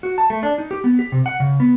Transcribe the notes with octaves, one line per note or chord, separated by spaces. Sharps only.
F#4
A5
A3
D4
D#4
G4
B3
G4
C3
F#5
C#3
B3